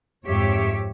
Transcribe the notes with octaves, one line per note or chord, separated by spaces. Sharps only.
F2 G#2 F3 G4 C#5 E5